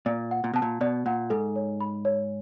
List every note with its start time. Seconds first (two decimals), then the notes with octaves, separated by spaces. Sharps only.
0.06 A#2 D5
0.31 F#5
0.44 A#2
0.54 B2 A5
0.62 A#2
0.81 B2 D5
1.06 A#2 F#5
1.30 G#2 A4
1.56 C#5
1.81 B5
2.05 C#5